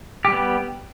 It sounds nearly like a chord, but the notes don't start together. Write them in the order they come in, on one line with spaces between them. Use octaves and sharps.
G4 G3 B3